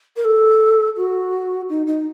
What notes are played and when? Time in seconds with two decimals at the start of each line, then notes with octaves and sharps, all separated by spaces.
0.16 A#4
0.25 A4
0.96 F#4
1.69 D#4
1.86 D#4